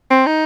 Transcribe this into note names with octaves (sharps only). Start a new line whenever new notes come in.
C4
D#4